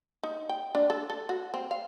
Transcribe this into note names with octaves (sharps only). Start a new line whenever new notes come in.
D#4
G5
D4
A4
A4
F#4
C4
F5